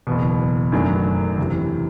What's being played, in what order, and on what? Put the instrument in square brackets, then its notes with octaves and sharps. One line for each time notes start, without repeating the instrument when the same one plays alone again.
[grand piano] F#1 E2 B2
F#2 D#3 F#3 A3 D4
E2 C3 E3